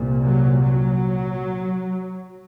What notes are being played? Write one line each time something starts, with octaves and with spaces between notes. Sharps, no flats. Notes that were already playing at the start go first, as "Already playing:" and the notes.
Already playing: C2 A#2
F#3
F#3